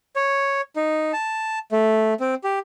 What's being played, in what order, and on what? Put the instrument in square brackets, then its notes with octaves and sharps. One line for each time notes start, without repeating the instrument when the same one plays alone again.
[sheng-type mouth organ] C#5
D#4
A5
A3
C4
G4